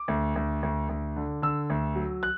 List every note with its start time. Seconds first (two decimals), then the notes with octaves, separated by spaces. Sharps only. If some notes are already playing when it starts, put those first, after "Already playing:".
Already playing: D6
0.08 D2
0.36 D2
0.63 D2
0.89 D2
1.16 D3
1.42 D3 E6
1.70 D2
1.96 F#3
2.23 F#6